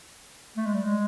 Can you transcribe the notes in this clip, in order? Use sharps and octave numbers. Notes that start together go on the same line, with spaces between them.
A3
G#3
G3
G#3